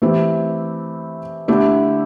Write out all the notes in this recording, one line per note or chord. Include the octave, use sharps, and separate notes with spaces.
E3 A3 C4 E4 G4
D3 A3 E4 G4